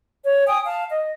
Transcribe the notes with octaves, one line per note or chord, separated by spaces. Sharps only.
C#5
G5 G#5 D#6
F5 A5
D#5